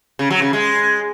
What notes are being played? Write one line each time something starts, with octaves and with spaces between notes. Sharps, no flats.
C#3
F#3
C#3
G#3